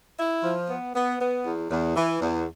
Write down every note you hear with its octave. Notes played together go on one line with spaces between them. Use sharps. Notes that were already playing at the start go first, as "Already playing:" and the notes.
E4
F3
B3
B3
B3
E2
E2
E3
E2